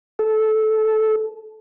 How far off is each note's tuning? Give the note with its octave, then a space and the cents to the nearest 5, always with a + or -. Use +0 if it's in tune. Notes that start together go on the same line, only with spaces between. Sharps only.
A4 -15